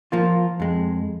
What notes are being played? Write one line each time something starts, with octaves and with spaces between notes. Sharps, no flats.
F3 A#3 F4
F2 G#3